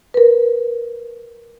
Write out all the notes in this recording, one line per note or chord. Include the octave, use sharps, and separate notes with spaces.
A#4 B4